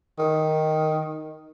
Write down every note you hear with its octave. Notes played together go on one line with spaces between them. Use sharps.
D#3